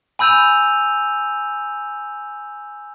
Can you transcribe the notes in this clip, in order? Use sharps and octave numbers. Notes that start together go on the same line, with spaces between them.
G#5 B5 E6 G6 D#7 F7